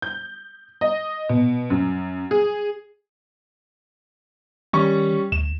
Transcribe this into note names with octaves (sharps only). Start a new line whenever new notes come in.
G6
D#5
B2
F#2
G#4
D#3 G3 C#4 C#6
D2 E7